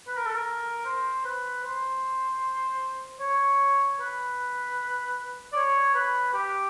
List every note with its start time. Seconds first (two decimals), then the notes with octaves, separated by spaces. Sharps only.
0.07 B4
0.17 A#4
0.26 A4
0.36 A#4
0.86 C5
1.25 B4
1.64 C5
3.21 C#5
4.00 B4
5.53 D5
5.56 C#5
5.95 B4
6.34 G4